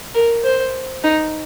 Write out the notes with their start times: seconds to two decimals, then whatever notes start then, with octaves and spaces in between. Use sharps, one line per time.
0.14 A#4
0.44 C5
1.03 D#4